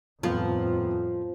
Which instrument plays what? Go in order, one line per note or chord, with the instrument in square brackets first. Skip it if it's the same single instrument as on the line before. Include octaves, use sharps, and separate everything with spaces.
[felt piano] D#1 B3 [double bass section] F2 A2 [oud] F3